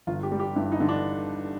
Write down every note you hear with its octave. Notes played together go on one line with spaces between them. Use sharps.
G1 F4
G4
G3
G4
G2 E4
D#4
D3
D4